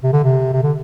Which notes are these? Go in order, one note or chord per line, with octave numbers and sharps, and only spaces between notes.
C3
D3
C3
C3
D3